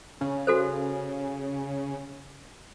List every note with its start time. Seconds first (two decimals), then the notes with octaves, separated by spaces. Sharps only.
0.21 C#3
0.47 F#4 A4 C5